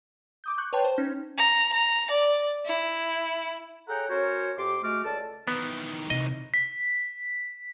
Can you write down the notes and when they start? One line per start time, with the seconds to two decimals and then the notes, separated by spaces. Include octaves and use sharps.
0.44 D6 D#6 G6
0.58 C#6 F#6 G6
0.73 B4 C#5 G5 A5 C6
0.84 C5
0.98 C#4 D#4
1.37 A#5
1.73 A#5
2.11 D5
2.66 E4
3.88 G#4 A4 C#5 F#5 G5 A#5
4.10 C#4 F#4 A#4 C5 C#5
4.57 F2 G4 C6 D6
4.83 G#3 A3 F#4 D6 F6
5.04 C#2 A4 D5 A5
5.48 D#3 E3 B3
6.10 C3 D#5
6.54 B6